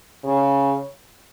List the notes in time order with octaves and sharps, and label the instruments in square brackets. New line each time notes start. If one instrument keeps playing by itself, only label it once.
[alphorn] C#3